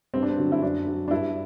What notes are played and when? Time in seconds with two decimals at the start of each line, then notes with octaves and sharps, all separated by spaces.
0.14 G2 C4
0.23 D4
0.30 C4
0.38 D3 F#3
0.52 E4
0.62 F#2 D4
0.87 F#3
1.08 D4
1.11 G2 E4